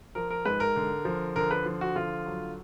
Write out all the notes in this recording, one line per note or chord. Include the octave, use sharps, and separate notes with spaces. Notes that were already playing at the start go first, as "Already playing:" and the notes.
F3 A#4
A#4
G#2 B4
A#4
D3
F3
D3 A#4
B4
F3
F#4
D3 F4
F#3